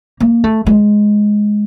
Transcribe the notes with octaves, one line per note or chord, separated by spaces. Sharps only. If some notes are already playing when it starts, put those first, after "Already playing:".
A#3
A3
G#3